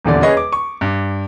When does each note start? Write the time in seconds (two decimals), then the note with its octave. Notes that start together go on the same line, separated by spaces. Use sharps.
0.05 D#1 E2 D3 D5
0.22 C#4 G#4 B4 D#5
0.37 D6
0.52 C#6
0.81 G2